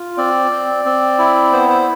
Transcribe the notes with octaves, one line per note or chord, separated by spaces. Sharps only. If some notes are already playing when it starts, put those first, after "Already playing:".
Already playing: F4
C4 D5
C4
C4
E4
B3 C5
C5